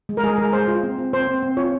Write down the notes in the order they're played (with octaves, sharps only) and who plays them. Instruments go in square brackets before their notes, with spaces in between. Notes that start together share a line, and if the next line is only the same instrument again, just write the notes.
[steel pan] G#3
A#4
G#3 G#4
G#3 A#4
G#3 C5
F4
C4
C4
C4 C5
C4
C4
F4 C#5